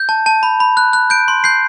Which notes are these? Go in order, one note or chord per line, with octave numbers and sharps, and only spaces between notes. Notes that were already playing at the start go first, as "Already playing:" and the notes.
Already playing: G6
A5
A5
B5
B5
F#6
F#6
G6 D7
C6
G6 C7